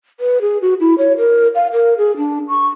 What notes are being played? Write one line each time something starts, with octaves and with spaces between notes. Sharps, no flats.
B4
G#4
F#4
E4
C#5
A#4
F5
A#4
G#4
D4
C#6